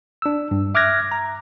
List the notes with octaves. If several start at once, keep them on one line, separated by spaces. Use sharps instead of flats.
D4 E6
G2
E5 D6 F6 F#6 G#6 A#6
A#5